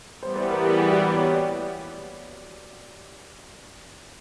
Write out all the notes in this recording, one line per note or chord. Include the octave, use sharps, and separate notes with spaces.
E3 G3 B3 C5
C5
A#4
G#4
G#4
F#4
G4
C#5
D5